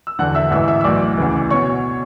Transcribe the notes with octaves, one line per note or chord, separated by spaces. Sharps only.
E6
E1 E2 D3 F#5 F#6
E5 E6
A1 G#2 E3 E5 E6
E5 E6
E6
B1 A2 E3 D5 D6
D2 C#3 E3
B2 C#5 C#6